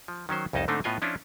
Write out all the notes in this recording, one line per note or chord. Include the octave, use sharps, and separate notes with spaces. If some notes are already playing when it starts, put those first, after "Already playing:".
F3
D#3 F#3 C#4 C5
C2 F2 C#4 D#4 D#5 A5
G#2 D3 A3 C4 D4 D#4
A2 B3 F4 D#5 G#5
F3 C#4 D4 E4 F4